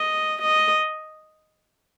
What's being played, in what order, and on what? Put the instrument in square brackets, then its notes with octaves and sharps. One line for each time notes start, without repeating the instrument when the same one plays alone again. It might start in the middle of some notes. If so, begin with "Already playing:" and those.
Already playing: [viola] D#5
D#5